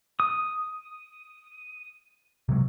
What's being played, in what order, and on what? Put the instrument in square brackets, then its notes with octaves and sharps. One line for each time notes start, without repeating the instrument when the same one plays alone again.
[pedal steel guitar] D#6
[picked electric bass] C3 F#3 G#3